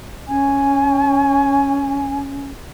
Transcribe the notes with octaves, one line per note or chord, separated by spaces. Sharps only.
C#4 G#5